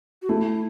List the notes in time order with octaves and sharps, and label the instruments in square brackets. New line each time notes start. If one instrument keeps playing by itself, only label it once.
[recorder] F#4
[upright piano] A3 [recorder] E4